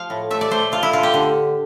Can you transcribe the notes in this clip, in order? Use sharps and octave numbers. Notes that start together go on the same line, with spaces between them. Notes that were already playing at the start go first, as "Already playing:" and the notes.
Already playing: F3 F5
A2
A3 E5
D5
A3 C5
A3 F4
E4
D3 F4
G4
D3